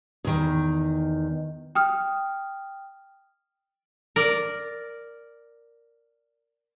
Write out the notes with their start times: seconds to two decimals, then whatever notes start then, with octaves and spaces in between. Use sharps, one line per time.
0.25 E2 D#3
1.75 G5 D#6 F6
4.16 A#4 D5